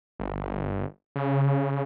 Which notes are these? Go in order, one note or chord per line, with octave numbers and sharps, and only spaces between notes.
G1
C#3